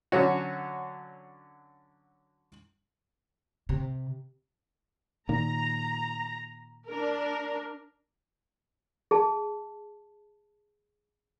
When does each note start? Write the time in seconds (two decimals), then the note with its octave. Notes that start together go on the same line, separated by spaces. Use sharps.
0.12 D3 F#3 C#4 F#4
3.69 C3
5.29 A#2 D#3 A#5
6.87 D4 A#4
9.11 G#4 A5